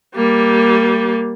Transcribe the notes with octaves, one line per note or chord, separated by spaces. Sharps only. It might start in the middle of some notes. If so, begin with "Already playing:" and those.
G3 A#3